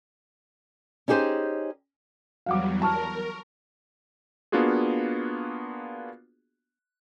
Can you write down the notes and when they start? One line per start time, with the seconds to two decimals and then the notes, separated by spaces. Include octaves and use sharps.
1.08 C#4 D#4 G4 G#4 C5
2.46 E2 F#3 G3 F5 F#5 D6
2.82 A#4 A5 C#6 F6
4.52 A#3 B3 D4 F4 F#4 G#4